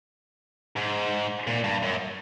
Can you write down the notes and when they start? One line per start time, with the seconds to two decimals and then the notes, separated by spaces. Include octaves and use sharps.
0.77 G#2
1.47 A#2
1.64 G2
1.83 F#2